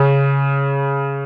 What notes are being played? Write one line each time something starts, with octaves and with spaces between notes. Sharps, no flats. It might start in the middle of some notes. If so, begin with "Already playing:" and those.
Already playing: C#3